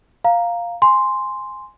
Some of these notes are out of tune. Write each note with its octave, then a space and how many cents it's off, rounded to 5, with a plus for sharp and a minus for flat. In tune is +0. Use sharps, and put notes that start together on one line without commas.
F5 +0 A#5 +0
G#5 +0 C6 +0